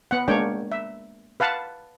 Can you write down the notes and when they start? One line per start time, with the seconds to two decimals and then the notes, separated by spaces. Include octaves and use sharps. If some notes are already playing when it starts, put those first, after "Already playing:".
0.11 B3 F#5
0.28 G#3 A#3 D4 C#5 G5
0.72 E5
1.40 B4 F5 F#5 A5